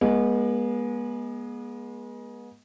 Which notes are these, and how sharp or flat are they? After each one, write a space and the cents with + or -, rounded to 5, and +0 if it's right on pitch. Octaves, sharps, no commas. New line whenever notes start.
G#3 +0 B3 -40